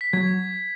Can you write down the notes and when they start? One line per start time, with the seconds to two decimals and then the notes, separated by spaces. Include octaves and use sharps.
0.01 B6
0.13 F#3 G#6